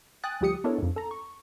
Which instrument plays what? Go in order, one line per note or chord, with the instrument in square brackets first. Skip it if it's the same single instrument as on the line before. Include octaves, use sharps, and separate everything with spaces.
[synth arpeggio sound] G5 G#5 D#6 F#6 A6
D2 F3 G3 G4 D#6 C#7
B3 D4 E4 A4 A#4 C#5
F2 G#2
A4 A#5
C#6